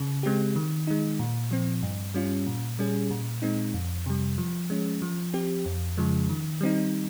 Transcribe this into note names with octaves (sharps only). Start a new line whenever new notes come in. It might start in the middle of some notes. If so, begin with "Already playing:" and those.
Already playing: C#3
G#3 C4 G4
D#3
G#3 D#4
A#2
F3 C4
G2
G3 C#4 F4
A#2
G3 C#4 G#4
A#2
G#3 C4 D#4
F2
C3 G3
F3
G#3 C#4
F3
C4 G4
F2
C#3 F3 G#3
D#3
G3 C4 D#4